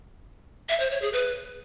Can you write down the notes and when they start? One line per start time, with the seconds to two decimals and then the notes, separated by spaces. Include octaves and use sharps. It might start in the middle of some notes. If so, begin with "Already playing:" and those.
0.69 E5
0.80 C5
0.91 C#5
1.02 G#4
1.13 B4